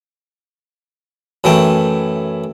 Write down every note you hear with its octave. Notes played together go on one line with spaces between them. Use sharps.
F#2 E3 A3 G5